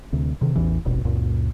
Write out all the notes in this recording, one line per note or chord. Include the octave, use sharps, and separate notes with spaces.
D2 C3
C3 D#3
A1 E2 E3
D#1 G#1 B2
C#2 F#2 A#2